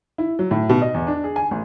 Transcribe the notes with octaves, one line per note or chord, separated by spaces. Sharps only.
E4
F#3
A2
B2
D#5
E2
D4
G#4
G#5
A1